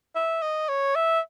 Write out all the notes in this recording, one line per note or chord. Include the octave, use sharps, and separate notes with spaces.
E5
D#5
C#5
E5